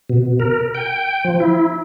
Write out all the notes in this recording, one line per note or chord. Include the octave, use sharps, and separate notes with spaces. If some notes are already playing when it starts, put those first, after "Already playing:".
B2
A#4
G5
F3
E4